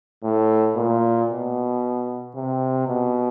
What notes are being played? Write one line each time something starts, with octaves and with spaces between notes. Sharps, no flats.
A2
A#2
B2
C3
B2